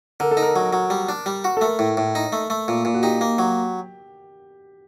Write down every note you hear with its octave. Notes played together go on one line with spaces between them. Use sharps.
D3 A#4
A4
D#4
A#4
F#3
F#3
G3
D4
G3
F#4
A4
A3 A#4
A2
A2
D#4
A3
A3
A#2
A#2
F#4
D#4 G4
A#3
F#3